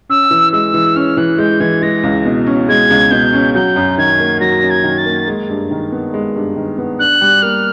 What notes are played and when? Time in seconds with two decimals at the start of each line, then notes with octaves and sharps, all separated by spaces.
0.09 C#4 E6
0.31 E3
0.53 G#3 E6
0.74 E3
0.96 C#4 F6
1.17 E3 F#6
1.38 G#3 G6
1.60 E3 G#6
1.82 G#3 A#6
2.03 C#2
2.25 B2
2.46 C#4
2.69 G#3 G#6
2.90 C#2
3.11 B2 G6
3.33 C#4
3.54 F#3 G6
3.76 F#2
3.98 D#3 G#6
4.20 A#3
4.40 F#3 A#6
4.63 F#2
4.70 G#6
4.84 D#3
4.98 A6
5.06 A#3
5.28 G#3
5.49 G2
5.71 D#3
5.92 B3
6.14 G#3
6.36 G2
6.56 D#3
6.78 B3
6.99 D4 F#6
7.21 G3
7.42 A#3 F6